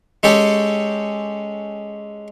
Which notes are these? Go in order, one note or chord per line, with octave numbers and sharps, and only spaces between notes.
G#3 C#4 G4 A4 G5